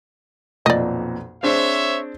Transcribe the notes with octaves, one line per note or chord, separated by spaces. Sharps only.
B1 F2 A#2 D5 D#5
C4 D4 G#4 C5 C#5 E5